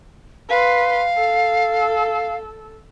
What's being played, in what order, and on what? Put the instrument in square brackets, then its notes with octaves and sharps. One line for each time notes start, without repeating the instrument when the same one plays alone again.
[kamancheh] B4 C6 [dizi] F5
[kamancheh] A4